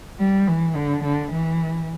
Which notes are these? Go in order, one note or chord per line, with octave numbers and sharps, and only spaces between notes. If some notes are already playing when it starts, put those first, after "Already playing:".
G3
E3
D3
D3
E3